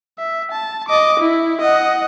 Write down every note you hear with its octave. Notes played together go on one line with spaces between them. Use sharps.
E5
A5
D#5 D6
E4
D#5 F#5